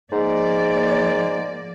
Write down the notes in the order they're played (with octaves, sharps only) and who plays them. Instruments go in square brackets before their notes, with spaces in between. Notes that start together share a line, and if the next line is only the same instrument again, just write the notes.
[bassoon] G#2 [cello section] F3 A#3 D5